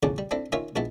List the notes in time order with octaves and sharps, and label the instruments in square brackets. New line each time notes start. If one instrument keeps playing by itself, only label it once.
[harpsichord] A1 E2 C#3 C#4 A5 D6
G3
C4 D4 E4 A4
D#3 C#4 F4 C#5 E5
A#1 G#3 B3 E4 A5